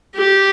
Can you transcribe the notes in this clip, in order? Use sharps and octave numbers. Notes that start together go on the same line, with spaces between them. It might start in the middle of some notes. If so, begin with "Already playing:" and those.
G4